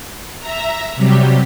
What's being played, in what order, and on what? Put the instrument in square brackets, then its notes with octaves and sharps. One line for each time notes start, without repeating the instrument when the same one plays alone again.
[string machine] E5 A#5
C3 F#3 G3 G4